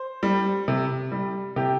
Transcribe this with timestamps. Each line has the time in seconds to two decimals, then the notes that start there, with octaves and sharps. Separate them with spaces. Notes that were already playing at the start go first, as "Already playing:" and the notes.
Already playing: C5
0.23 G3
0.68 C3
1.12 G3
1.56 C3 G4